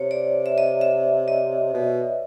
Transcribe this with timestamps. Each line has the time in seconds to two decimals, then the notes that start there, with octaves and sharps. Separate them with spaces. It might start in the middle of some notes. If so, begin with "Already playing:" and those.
Already playing: C3 C#5
0.11 D5
0.46 E5
0.58 D#5
0.81 E5
1.28 D#5
1.74 B2